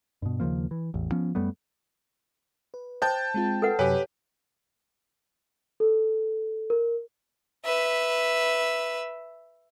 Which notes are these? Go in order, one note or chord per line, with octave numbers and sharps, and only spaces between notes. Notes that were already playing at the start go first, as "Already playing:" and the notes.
G2 B2
D#2 C#3 F3 A#3
E3
A1 E2
F3 B3 C#4
F#2 G3 A3 B3
B4
C5 G5 A5 G6
G#3 C4 F4
A4 B4 F#5
F#2 C3 F#3 G4 B4 C#5 G#5 A5
A4
A#4
B4 E5